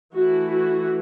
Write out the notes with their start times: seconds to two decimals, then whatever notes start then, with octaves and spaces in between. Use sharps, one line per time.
0.13 E3 A3 E4 F#4
0.51 F#4